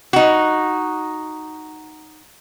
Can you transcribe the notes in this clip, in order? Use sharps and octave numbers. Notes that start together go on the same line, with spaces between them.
D#4 F#4